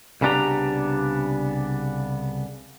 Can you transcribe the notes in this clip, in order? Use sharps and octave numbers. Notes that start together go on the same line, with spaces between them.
C2 C#3 B3 D4 G4 A#5